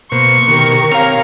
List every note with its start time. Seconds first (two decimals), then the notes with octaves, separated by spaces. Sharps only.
0.12 B2 A#3 C5 C#6
0.48 B2 D#3 G4 A#4
0.91 C4 G4 A#4 C#5 F5 C#6